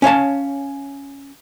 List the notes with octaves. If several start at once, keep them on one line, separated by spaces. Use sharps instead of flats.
C#4 C#5 F5 A5